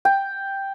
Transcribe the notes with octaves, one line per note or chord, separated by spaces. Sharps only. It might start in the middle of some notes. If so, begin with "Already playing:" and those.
G5